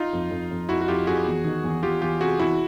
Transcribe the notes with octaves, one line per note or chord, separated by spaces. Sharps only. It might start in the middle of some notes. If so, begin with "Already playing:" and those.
Already playing: D#4 F4
F2
F2
F2
F2 E4 F#4
F#4
F2 F4 G4
F2 F#4 G#4
E2
D#3
E2
E2 F4 G4
E2 F4 G4
C3 F#4 G#4
E2 E4 F#4